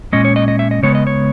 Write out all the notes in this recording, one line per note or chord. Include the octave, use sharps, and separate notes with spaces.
A#2 G#3 C#4 D#5
C#5
D#5
D#5
E5
D#5
C#3 G#3 B3 C#5
D#5
C#5